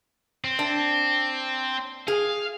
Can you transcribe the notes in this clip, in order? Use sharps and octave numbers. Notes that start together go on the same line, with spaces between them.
C4
D4
G#4 F5